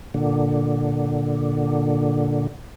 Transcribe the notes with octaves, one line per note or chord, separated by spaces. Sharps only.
A#2 D3